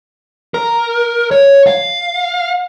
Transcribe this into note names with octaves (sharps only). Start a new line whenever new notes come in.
A#4
C#5
F5